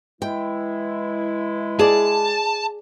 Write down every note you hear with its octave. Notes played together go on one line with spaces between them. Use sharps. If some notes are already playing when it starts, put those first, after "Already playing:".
E3 G#3 E4 G5
G#4 D5 A5